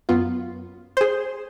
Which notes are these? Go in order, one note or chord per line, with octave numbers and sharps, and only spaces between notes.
F#2 B3 F4
G#4 C5